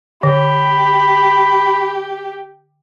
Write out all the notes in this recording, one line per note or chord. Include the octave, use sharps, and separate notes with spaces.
D3 G4 B5